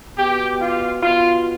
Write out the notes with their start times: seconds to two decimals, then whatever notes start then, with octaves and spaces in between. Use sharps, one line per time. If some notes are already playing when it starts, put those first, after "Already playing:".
0.17 B2 G4
0.60 F4
1.02 B2 F4